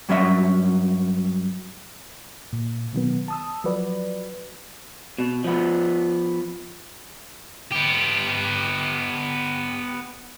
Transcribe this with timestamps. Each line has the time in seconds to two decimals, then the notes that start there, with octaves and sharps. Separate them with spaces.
0.09 G2 F#3 C#4 E5
2.53 A#2
2.93 B2 D#3 F#3 B3
3.28 A5 D#6 E6
3.64 F3 F#3 F#4 B4 D5
5.18 B2
5.44 F3 B3
7.71 B3 G4